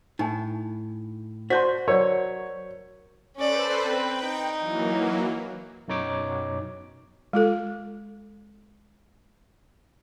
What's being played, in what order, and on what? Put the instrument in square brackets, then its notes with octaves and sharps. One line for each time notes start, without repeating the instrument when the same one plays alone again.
[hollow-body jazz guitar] A2 [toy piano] D#4 G#5
[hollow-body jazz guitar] F#4 [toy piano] C5 D5 A5 [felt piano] C6 G6 B6
[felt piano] F#3 [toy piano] A#4 D5 [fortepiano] C#5
[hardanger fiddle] C#4 D5 [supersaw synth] A4 B4 C5
[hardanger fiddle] C4 B4 [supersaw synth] G5
[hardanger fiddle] D#4
[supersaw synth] E3 F#3 A#3
[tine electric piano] F#2 B2 D#4 C#5 D6
[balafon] G#3 F4 A4